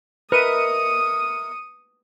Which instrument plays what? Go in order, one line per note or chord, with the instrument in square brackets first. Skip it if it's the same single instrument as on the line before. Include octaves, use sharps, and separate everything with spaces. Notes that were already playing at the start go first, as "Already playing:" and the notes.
[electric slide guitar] A#4 D#5 E5 [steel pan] B4 [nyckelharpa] D#6 [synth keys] C#7 D#7